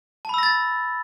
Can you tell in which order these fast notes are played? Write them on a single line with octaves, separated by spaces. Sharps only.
A5 B5 E6 A#6 A6